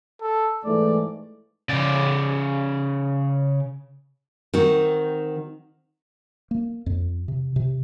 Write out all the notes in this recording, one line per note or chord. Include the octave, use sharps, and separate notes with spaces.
A4
G#2 E3 A3 D5
C#3 D5
D#3 C4 F#4
A#3
F2
C3
C3